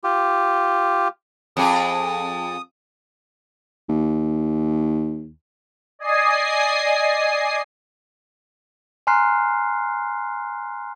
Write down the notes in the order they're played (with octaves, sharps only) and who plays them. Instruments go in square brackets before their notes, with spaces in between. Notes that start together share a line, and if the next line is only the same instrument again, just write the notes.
[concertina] F4 G4
[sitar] F2 G#4 [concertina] D#6
[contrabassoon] D#2
[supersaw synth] D5 D#5 G#5 D#6 C7
[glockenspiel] G#5 A#5 C6 F6 F#6 C7